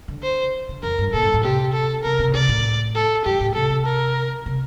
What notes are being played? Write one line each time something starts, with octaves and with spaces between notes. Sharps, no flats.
D3
C5
D3
F2 A#4
G2
A#2 A4
G2
A2
C3 G4
A4
C3 A#4
C3
A#2
C3 D5
A2
A4
G2 G4
A2
C3 A4
C3
A#4
C3